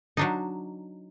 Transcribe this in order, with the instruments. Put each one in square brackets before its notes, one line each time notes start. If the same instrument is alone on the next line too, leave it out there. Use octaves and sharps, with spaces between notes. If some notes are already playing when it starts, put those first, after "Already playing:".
[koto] F#3 D4 D#4